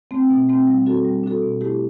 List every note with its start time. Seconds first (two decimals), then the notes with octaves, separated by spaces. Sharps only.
0.11 A3 C4
0.30 B2
0.49 A3 C4
0.67 G3
0.86 D4 F#4 A4
1.04 G3
1.24 D4 F#4 A4
1.42 B2
1.61 A3 E4 G4